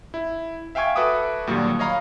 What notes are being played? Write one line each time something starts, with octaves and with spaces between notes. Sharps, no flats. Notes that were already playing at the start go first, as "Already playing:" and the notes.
E4
E5 F5 G5 G#5 C#6 G#6
F#4 A4 B4 E5 D6 D#6
D#2 A#2 D3 F#3 G3
C#5 D#5 F5 A#5 B5